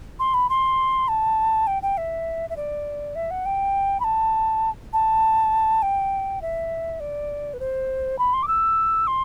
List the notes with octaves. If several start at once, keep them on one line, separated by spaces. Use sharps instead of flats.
C6
B5
C6
A5
G5
G5
E5
E5
D5
E5
F#5
G5
B5
A5
A5
G5
E5
D5
B4
C5
B5
C6
D6
E6
C6